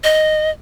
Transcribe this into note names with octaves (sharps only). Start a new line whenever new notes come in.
D#5